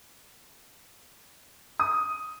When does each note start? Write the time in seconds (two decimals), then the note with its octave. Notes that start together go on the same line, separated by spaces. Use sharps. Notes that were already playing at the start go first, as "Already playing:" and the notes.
1.80 D#6